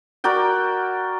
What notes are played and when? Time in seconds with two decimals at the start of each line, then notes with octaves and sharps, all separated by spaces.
0.24 F#4 A#4 D5 G5